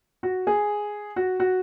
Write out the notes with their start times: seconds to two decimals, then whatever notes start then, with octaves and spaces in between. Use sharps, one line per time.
0.23 F#4
0.47 G#4
1.16 F#4
1.40 F#4